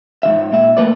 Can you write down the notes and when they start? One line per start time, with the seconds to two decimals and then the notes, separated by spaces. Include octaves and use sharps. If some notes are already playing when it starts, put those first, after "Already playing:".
0.23 G#2 C#3 E5
0.52 A#2 E5
0.77 A3 A#3 B4 D5